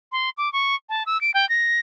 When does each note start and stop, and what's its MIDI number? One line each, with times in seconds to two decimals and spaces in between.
0.12 0.30 84
0.38 0.52 86
0.53 0.75 85
0.89 1.03 81
1.06 1.20 88
1.21 1.31 98
1.34 1.48 79
1.49 1.80 94